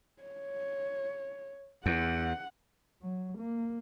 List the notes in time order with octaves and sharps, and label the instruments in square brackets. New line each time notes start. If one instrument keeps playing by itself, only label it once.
[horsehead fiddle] C#5
[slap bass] E2 [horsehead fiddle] F#5
[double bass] F#3
A#3